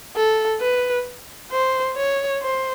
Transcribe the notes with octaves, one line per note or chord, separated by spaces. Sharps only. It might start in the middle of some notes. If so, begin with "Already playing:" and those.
A4
B4
C5
C#5
C5